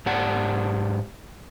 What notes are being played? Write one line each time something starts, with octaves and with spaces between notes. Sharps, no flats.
G#2 G4 D5 F#5 A5